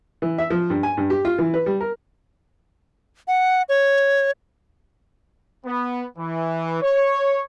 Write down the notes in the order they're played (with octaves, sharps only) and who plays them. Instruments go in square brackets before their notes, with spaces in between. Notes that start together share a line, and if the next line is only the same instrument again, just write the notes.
[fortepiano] E3
E5
F3
G2
G#5
G2
G4
F4
E3
B4
G3
A#4
[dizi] F#5
C#5
[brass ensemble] B3
E3
C#5